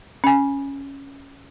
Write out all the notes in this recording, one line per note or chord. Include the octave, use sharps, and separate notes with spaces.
C#4 G#5